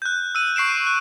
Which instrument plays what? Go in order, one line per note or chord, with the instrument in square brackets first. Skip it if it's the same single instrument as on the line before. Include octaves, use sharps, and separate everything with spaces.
[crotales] F#6 G6
E6 D#7
C#6 C7 D7 E7
F#6